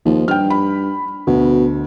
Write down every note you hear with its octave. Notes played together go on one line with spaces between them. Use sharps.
D#2 F3
G2 G5 F6
B5
D2 B2